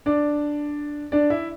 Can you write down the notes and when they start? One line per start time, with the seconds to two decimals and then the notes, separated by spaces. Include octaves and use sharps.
0.06 D4 D5
1.12 D4 D5
1.30 E4 E5